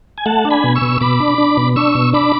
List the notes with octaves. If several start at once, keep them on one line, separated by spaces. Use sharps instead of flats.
G#5
A3 F#5 A5
D4
G#5 B5
B2
C#6 E6
B2
B2 B5 D6
D4
D4
B2
D4 C#6 E6
B2
D4 B5 D6